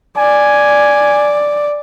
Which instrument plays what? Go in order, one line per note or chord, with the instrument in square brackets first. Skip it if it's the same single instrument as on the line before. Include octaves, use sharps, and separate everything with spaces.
[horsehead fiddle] D5 [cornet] G#5